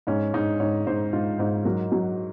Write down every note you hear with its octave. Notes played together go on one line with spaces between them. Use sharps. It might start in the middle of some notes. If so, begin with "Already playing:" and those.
G#2 C#4
G#2 D#4
G#2 C#5
G#2 C5
G#2 F4
G#2 C5
F#3 A#4
F#3